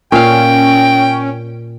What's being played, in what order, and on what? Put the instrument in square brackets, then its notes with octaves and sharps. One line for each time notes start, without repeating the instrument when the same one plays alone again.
[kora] A#2 F5 [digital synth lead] C#4 [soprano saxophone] G5